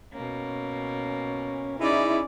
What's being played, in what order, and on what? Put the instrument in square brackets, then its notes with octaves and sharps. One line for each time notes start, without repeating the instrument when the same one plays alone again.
[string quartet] B2 A#3 [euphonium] C#4
[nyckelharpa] C#4 D5 [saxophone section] D#4 E4 [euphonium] G#4